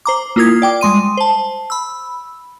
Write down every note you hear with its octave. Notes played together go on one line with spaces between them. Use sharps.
C5 A#5 D6
A#3 E4 F4 A#4 D#6 G#6
D5 G5 D6
G3 G#3 C6 D#7
C5 A5
B5 E6